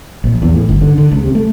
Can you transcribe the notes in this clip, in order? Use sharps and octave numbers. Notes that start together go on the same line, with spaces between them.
A#1
E2
A2
G1
D3
D3
C#2
C3
A3